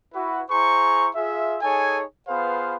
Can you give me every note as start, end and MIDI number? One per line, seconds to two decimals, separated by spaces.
0.14 0.41 64
0.14 0.41 66
0.14 0.41 71
0.50 1.08 64
0.50 1.08 68
0.50 1.08 72
0.50 1.08 82
0.50 1.08 85
1.15 1.56 65
1.15 1.56 68
1.15 1.56 76
1.62 2.02 63
1.62 2.02 68
1.62 2.02 69
1.62 2.02 73
1.62 2.02 80
2.27 2.75 59
2.27 2.75 65
2.27 2.75 68
2.27 2.75 71
2.27 2.75 72
2.27 2.75 77